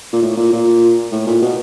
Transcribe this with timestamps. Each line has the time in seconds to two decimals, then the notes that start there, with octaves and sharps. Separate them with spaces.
0.13 A#2
0.22 A2
0.37 A#2
0.52 A#2
1.12 A2
1.27 A#2
1.42 B2